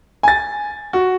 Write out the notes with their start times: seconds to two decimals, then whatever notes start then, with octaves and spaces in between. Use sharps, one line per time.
0.23 G#5 A6
0.93 F#4